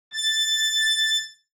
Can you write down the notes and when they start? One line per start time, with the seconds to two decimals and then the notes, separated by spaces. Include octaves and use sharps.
0.13 A6